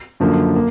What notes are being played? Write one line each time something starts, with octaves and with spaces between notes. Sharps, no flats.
F#2 D3 F3 A#3
A#3